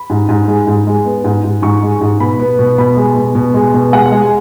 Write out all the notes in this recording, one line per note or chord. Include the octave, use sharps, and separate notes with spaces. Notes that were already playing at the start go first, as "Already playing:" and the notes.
Already playing: B5
G#2
G#2
G#3
G#2
G#3
B3
G#2
G#2
G#2 C#6
G#3
G#2
B2 B5
B3
B2
B2 B5
G#3
B2
B2
G#3
B2
G#3 F#5
G#3
G#5